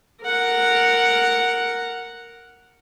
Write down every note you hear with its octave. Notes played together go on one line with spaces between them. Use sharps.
A#4 F#5